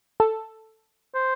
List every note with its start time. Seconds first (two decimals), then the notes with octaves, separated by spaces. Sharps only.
0.20 A4
1.14 C5